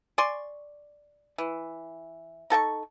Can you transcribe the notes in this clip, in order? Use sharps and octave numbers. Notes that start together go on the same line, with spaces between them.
D5 G#5 C6 C#6
E3
D#4 A4 G5 C#6